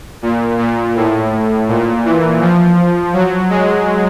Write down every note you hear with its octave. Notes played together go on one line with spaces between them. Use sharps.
A#2
A#2
A2
A#2
E3
F3
F#3
G#3